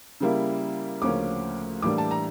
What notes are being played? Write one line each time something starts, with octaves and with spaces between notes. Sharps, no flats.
C#3 G3 A#3 E4
D2 C#3 F3 A#3 C#4 D6
A2 E3 G3 A#3 D4 D6
A5
A#5